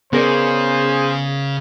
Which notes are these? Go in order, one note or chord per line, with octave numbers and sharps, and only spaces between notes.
C#3 B3 G#4 A#4 C5 D5